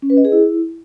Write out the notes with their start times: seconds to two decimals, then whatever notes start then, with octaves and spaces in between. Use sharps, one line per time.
0.02 C#4
0.10 B4
0.17 D#5
0.25 G#4
0.32 E4